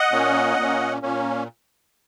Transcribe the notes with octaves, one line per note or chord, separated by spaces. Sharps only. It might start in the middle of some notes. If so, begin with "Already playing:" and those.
Already playing: D#5 F#5
A#2 A#3 C#4
A#2 A#3 C#4
A#2 A#3 C#4